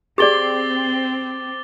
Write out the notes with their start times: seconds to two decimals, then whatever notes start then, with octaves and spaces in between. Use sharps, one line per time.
0.18 C4 G4 G#4 D5 D6 A6 G7